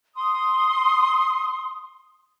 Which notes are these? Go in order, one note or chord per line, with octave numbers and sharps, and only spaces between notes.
C6 D#6